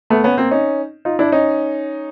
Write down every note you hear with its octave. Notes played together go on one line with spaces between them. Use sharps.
A3 B3
B3 C#4
A#3 C4
C#4 D#4
D#4 F4
D4 E4
C#4 D#4